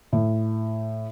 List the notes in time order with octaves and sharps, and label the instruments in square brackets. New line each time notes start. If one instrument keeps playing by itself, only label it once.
[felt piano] A2